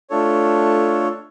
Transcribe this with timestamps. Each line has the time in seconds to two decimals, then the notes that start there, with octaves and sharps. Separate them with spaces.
0.10 A3 D4 F4 A4 C#5